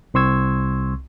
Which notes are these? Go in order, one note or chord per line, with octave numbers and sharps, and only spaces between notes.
C2 C4 C6 C#6 E6 G#6